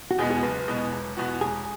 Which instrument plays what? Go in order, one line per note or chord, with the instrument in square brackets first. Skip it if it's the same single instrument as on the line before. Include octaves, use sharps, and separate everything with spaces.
[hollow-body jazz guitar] F#4
[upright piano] E2 B2 G#3 B3 [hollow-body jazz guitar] G#4
[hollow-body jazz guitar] G#4
[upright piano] F#1 [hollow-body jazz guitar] B4
[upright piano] E2 B2 G#3 B3
E1
E2 B2 B3 F#4
[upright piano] E1 [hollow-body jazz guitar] G#4